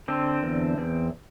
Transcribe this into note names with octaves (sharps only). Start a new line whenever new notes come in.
D3 C4
E2
E2